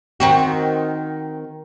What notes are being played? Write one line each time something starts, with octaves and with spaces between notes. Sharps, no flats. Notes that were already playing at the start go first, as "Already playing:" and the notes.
D#3 C4 F#4